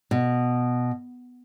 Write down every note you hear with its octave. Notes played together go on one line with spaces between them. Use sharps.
B2